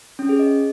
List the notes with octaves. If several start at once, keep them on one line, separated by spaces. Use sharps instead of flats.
C#4
G#4
D#5